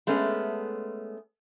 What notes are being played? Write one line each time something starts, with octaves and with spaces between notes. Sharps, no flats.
G#3 A3 B3 C#4